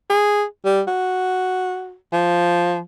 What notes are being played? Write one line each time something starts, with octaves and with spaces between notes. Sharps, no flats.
G#4
G3
F#4
F3